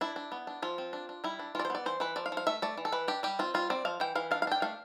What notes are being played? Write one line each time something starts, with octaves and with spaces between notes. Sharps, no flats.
D4 E4
D4
B3
D4
F3 F4
C4
D4
D4
G3 E4
D4
E3 F4 D5
C5
B3 D5
E3 C5
E3 B4
F3 D5
F5
F3
F5
A3 E5
A3 D5
E3
A4
E3 B4
D4 G4
G3 G4
C4 F4
G3 F4
C4 D5
F3 F5
E3 G5
E3 F5
D4 F5
F5
D4 G5
A3 F5